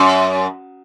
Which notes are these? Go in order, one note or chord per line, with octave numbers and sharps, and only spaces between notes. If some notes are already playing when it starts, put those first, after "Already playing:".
Already playing: F#2